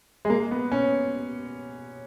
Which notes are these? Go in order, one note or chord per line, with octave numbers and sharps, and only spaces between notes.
G#3
A#3
B3
C#4